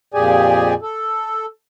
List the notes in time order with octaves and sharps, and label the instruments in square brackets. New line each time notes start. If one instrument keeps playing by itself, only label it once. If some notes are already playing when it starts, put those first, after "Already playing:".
[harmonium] F2 A#2 G4 G#4 D5 G#5
A4